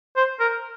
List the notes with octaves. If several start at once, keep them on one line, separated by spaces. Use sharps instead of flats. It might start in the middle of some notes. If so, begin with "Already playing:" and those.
C5
A#4